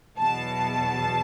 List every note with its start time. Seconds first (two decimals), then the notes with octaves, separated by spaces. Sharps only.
0.18 E2 B2 F#3 A5